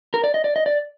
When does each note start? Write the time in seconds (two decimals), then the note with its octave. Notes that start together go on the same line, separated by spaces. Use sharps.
0.14 A#4
0.24 D5
0.34 D#5
0.44 D5
0.56 D#5
0.66 D5